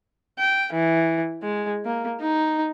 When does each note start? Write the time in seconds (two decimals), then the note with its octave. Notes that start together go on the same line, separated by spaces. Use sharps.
0.39 G5
0.73 E3
1.43 G#3
1.85 A#3
2.21 D#4